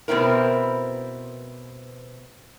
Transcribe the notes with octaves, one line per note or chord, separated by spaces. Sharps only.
B2 B3 C4 E4 A#4